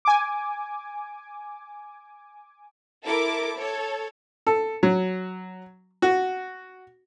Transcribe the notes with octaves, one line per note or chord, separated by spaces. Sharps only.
G#5 D6
E4 A4 A#4 D6
A4 C#5
A4
F#3
F#4